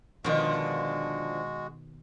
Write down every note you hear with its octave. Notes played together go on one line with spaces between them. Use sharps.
B2 D3 D#3 F3 G#3 F#4